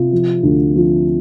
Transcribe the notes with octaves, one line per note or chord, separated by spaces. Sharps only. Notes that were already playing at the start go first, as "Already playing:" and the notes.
Already playing: C3 F4
F3
D2
F3